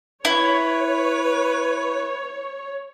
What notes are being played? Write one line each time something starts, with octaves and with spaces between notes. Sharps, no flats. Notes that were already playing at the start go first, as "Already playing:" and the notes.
E4 B4 C#5